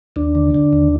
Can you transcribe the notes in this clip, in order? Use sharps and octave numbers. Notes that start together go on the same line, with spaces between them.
D#2 D4
D3
D3
D#2